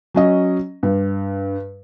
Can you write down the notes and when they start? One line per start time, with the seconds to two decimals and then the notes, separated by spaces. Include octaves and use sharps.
0.14 F#3 C#4 D#5
0.83 G2